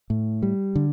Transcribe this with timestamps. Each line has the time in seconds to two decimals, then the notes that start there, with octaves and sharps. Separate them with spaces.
0.10 A2
0.43 G3
0.75 D3